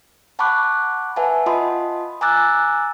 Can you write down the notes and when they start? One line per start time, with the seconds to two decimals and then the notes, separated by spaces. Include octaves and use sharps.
0.39 F#5 A5 B5 C#6 D6 F#6
1.16 B4 E5 F#5 G#5 A5
1.46 F4 D#5 A5 B5 C6 D#6
2.21 G#5 A#5 D6 E6 F#6 A6